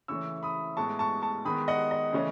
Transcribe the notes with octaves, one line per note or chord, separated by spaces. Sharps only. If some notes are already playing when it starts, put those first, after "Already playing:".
C#3 E3 A3 C#4 C#6 E6
B5 D#6
A2 G#3 B3 A5 C#6
A5 C#6
A5 C#6
D#3 G#3 B3 B5 D#6
D#5 F#5
D#5
C#3 E3 A3 C#4